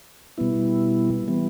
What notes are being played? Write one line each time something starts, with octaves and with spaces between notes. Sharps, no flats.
B2 G3 B3 E4
E3 G3 B3